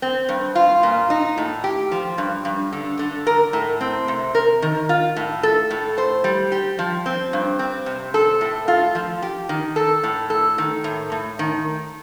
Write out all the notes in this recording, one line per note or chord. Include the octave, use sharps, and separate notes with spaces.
C4
G2
F4
A#2
D#4
A2
G4
F3
G2
G2
D3
D3
A#4
A2
C4
C3
A#4
D#3
F4
A2
A4
A2
C5
G3
G4
F3
C4
G2
C4
C3
A4
A2
F4
F3
G4
D#3
A4
A2
A4
D#3
A2
A2
D#3